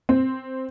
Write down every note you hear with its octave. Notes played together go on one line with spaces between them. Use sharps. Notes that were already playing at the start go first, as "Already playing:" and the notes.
C4